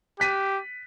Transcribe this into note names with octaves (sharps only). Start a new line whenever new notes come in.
G4 F#6 B6 D#7